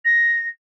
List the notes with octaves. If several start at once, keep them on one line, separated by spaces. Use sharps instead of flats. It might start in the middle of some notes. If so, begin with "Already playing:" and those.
A#6